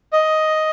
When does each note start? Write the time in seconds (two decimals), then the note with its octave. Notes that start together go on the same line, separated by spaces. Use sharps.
0.13 D#5